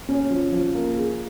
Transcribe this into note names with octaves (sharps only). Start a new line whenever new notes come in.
C#4
F3
F3
A#3
G#4